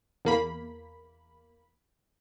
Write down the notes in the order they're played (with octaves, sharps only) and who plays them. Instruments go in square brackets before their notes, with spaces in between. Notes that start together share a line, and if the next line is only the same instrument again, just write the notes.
[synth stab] E2 A#3 B5